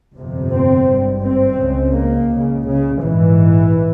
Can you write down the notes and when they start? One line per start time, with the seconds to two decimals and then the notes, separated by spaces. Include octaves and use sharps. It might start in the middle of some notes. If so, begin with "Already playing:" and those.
0.16 G1 F2 C3
0.52 C4
0.87 G#1 G2
1.23 C4
1.59 C#2 C#3
1.94 A#3
2.31 C#2 C#3
2.66 C#3
3.02 A#1 G#2 E3